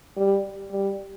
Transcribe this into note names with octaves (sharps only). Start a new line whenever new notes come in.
G3
G3